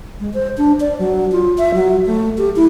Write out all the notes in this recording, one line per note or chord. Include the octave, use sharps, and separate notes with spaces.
G#3
C5
D4
D5
F#3
F4
E5
F#3
A3
G4
E4